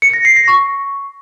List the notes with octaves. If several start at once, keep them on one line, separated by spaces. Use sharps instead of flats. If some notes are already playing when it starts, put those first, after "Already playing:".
C#7
A#6
C7
A#6
C#6